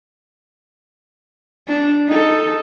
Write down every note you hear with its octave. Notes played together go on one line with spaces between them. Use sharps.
D4
D#4 A4